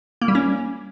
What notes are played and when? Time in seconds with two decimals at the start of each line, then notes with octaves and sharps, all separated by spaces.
0.22 A#3
0.28 G3
0.35 C#4